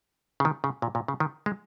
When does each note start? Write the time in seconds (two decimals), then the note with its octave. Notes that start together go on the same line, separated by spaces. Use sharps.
0.40 C#3
0.45 D#3
0.64 C#3
0.82 A#2
0.95 A#2
1.08 C#3
1.20 D#3
1.46 G#3